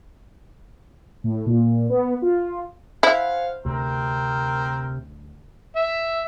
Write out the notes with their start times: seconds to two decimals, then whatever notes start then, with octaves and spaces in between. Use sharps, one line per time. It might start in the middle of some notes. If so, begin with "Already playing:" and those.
1.24 A2
1.46 A#2
1.90 B3
2.22 F4
3.03 E4 C5 F5 F#5 G#5
3.65 D2 C3 C4 A#4
5.76 E5